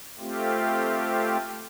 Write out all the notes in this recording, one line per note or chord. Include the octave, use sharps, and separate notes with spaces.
A3 C4 F4 G4